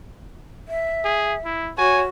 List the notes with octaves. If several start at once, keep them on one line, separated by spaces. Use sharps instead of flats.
E5
G#4
E4
F#4 C#5 G#5